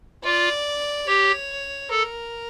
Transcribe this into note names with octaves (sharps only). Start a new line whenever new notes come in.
F4 D5
G4 C#5
A4 A#4